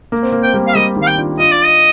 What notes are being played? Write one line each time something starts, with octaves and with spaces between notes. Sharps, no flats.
A#3
C4
A#3
C4 G5
G3 A#3
F5
G3 A#3 D#5
D#3 G3
F5
G5
D4 F4
D4 F4 D#5
D5
D#5